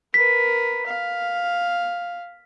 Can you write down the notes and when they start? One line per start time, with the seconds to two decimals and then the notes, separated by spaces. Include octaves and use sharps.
0.14 A#4 B4 B6
0.86 F5